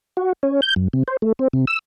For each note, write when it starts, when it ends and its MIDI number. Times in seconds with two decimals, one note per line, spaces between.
0.17 0.33 66
0.43 0.61 61
0.62 0.74 91
0.76 0.88 42
0.93 1.03 48
1.08 1.17 72
1.22 1.33 57
1.39 1.48 60
1.53 1.65 48
1.67 1.79 88